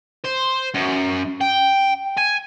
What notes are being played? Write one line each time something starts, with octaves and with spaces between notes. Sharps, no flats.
C5
F#2
G5
G#5